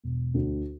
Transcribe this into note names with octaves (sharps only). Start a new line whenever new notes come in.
E1
D2